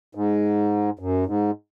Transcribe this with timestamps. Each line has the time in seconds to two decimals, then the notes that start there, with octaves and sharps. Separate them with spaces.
0.15 G#2
0.99 F#2
1.27 G#2